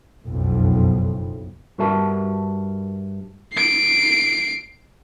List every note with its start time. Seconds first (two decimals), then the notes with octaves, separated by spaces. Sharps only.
0.24 F#1 B1 F2
1.78 G2 F#4 G4 A#4 E5 A5
3.53 C7 D7